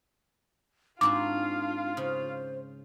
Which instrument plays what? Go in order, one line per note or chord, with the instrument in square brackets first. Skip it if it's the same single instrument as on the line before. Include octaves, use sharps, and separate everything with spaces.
[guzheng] G#2 C4 F#4 [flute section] D4 [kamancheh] F4 F5 [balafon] D6
[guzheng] C#3 [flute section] C5